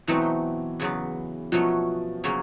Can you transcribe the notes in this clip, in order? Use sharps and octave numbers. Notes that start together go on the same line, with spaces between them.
B2 E3 F#3 A3 C4 D#4
E2 C#3 F#3 B3
B2 F3 F#3 A3 C#4
C#3 F#3 A#3 C#4